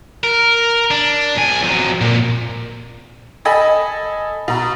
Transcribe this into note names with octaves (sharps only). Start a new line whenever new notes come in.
A#4
D4
B1 G#5
F2 F#3
A#2
A4 D#5 G#5 B5
B2 A#5